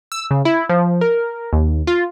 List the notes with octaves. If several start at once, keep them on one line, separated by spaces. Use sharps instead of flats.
E6
C#3
E4
F3
A#4
D#2
F4